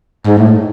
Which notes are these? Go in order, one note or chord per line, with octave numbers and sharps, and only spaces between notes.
G#2
A2